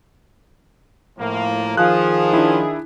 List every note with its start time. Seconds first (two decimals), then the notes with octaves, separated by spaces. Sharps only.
1.19 A2 F3 A#3
1.77 D#3 F3 G#4 F#6
2.33 D4 E4